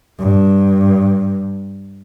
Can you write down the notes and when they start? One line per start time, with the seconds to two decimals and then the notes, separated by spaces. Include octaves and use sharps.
0.19 G2